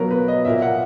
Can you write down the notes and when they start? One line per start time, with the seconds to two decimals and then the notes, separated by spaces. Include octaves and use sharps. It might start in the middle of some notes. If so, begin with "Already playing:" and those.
Already playing: B2 F#3 A#3 A#4 B4
0.11 B4
0.28 D#5
0.45 A#2 A#3 E5
0.62 F#5